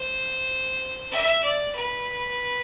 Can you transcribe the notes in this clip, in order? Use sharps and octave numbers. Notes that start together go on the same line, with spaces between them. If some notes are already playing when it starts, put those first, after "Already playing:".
Already playing: C5
E5
D5
B4